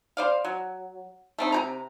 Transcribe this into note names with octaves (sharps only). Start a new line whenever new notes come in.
C5 D5 F5
F#3
A3 C4 D#4
C3 G4 A#5